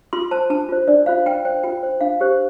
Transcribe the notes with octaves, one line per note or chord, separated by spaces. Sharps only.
F4 C6
C5 A5
D4 A5
F4 C5
D4 D5
F4 C5 F5
F4 G5
C5 G5
F4 G5
C5
D4 F5
G4 C5